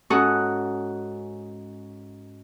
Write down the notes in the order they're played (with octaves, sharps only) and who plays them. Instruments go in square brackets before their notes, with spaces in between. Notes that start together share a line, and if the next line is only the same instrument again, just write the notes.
[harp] G#2 C#4 F#4 A4 F#5 D#6